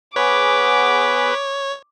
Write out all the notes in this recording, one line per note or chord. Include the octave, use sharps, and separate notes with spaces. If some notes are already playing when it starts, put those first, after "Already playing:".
B3 G#4 B4 C#5 D6